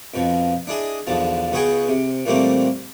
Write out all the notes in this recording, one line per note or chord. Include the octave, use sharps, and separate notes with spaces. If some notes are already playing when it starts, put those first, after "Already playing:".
F2 B2 F3
D4 E4 G#4 D#5
B1 E2 D3 F3 A5
C#2 B3 F#4 G#4 G5 G#5
C3
A#2 E3 G3 A3 A#3 C4